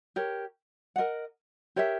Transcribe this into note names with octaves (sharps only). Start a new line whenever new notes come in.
G4 A#4 C#5
A#4 D#5 F#5
G4 A#4 C#5 E5